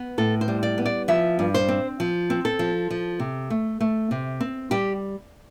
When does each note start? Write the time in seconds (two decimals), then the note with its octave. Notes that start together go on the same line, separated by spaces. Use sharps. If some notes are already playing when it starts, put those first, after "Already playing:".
Already playing: B3
0.18 A2 A4
0.41 C5
0.48 G3
0.63 D5
0.78 B3
0.86 D5
1.08 F3 E5
1.39 G2
1.54 C5
1.68 C4
2.00 F3
2.30 C4
2.45 A4
2.59 F3
2.91 F3
3.20 C3
3.50 A3
3.81 A3
4.11 C3
4.41 C4
4.71 G3 G4